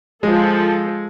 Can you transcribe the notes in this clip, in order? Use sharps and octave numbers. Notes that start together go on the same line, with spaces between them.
F3 G#3 A4